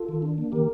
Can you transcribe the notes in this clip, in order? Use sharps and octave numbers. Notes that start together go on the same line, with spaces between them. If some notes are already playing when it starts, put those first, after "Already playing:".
Already playing: F4 A4
D#3
D4
A#3
D#3 G4 A#4